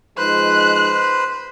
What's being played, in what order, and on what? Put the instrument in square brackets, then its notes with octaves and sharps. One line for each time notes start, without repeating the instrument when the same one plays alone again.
[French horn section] F3 G#3 D#4 [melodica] B4 C5 [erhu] F#6